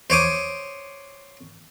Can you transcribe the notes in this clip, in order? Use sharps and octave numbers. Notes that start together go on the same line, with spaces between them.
C5 C#5 D6 D#6